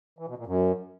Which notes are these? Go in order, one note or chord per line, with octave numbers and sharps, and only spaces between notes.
E3
B2
A#2
F#2